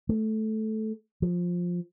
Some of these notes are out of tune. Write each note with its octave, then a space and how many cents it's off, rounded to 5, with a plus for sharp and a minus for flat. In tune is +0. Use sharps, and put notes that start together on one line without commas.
A3 -10
F3 +10